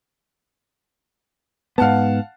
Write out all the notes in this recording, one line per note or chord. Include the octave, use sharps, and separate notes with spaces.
G#2 B3 F5 F#5 A5